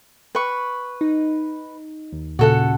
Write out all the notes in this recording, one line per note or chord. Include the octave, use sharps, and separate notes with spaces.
B4 C#6
D#4
D#2
A#2 C#3 F#4 A4 F#5